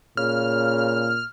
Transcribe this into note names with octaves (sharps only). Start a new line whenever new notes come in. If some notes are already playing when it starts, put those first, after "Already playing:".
A#2 C#3 F6